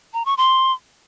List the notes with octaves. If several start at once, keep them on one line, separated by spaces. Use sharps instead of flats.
A#5
C#6
C6